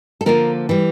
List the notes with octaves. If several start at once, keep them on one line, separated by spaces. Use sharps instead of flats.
A4
D3 F3 A#3 F4 A#4
E3 G3